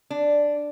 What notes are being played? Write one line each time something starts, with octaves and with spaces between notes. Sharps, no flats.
D4